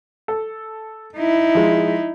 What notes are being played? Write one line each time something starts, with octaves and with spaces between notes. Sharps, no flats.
A4
D#4 E4
F3 G#3